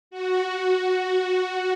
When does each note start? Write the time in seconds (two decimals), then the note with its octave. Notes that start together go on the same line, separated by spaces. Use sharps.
0.11 F#4